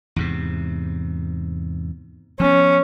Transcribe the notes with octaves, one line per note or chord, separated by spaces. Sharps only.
E2 G#2 C3
F3 B3 C#4